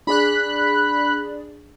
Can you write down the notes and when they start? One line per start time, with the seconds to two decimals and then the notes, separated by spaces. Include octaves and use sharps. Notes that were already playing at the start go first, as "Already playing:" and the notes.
0.07 D4 G#4 D5 B5 F#6